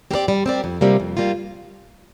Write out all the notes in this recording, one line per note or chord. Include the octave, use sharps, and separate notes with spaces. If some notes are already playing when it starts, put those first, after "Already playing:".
C4 G4 A#4 D5
G3
C4 G4 A#4 D5
F2
C3 G3 A#3 F4
F2
G3 A#3 F4